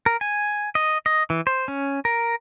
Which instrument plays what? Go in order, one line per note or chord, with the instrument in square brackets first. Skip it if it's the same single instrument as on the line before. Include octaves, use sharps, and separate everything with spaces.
[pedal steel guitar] A#4
G#5
D#5
D#5
E3
C5
C#4
A#4